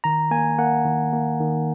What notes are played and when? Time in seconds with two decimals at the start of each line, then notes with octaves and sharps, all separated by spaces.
0.04 D#3 A#5
0.31 A#3 G#5
0.59 A#3 F#5
0.85 D#3
1.13 A#3
1.40 D#3